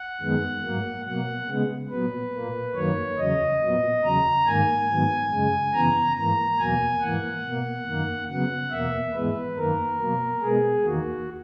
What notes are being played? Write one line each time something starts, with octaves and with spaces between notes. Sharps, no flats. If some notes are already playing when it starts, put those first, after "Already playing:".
Already playing: F#5
F#2 D#3 G#3 B3
G#2 F#3 A#3
B2 F#3 A#3 F#5
C#3 G#3 B3
A#2 F#3 B3 B4
A#2 A#3
F#2 D#3 F#3 A#3 C#5
E2 C#3 F#3 D#5
A#2 F#3 B3
E2 C#3 F#3 A#5
G#2 D#3 A#3 G#5
G#2 D#3 F#3 B3
F#2 C#3 G#3
F#2 C#3 E3 B3 A#5
G#2 E3 A#3 A#5
E2 B2 F#3 A#3 G#5
G#2 E3 A#3 F#5
B2 A#3
F#2 D#3 A#3
C#3 F#3 B3 F#5
E2 B2 A#3 E5
G#2 E3 G#3 B3 B4
F#2 D#3 A#3 A#4
B2 F#3 A#3
B2 G#3 B3 G#4
E2 D#3 A#3 F#4